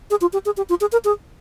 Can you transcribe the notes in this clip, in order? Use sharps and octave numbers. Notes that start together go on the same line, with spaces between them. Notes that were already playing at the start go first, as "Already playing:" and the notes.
G#4
F4
G4
G#4
G4
F4
G#4
A#4
G#4